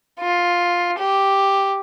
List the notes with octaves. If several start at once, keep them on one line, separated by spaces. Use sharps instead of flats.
F4
G4